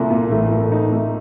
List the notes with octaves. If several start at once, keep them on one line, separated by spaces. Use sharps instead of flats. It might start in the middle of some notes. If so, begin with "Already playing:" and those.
Already playing: C2 A#2 A3
A#2
A1 A2 A3
A#2
D#4
A3